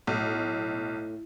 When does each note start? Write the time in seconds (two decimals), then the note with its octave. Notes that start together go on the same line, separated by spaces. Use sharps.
0.07 B1 A2